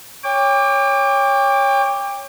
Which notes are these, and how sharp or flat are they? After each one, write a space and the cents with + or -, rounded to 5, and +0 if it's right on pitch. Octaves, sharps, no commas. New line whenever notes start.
C#5 +0 G5 +35 D6 +0